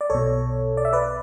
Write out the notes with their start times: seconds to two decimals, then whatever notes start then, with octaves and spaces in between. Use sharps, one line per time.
0.01 D5
0.10 B1 B2 A4 C#5
0.77 D5
0.85 E5
0.93 B4 D5